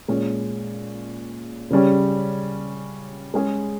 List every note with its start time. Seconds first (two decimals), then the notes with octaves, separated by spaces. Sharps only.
0.08 A#2 G#3 C#4
1.71 C#3 G3 C#4
3.34 G#3 C#4 G#4